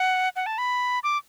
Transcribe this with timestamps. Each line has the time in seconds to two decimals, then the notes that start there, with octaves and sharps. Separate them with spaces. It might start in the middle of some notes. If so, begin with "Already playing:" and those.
Already playing: F#5
0.36 F#5
0.46 A5
0.58 B5
1.03 D6